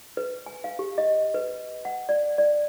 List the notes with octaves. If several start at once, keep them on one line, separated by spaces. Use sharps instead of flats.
B4
G#5
F5
G4
D#5
B4
F#5
D5
D5